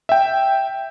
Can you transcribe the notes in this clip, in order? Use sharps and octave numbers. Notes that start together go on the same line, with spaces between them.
E5 G5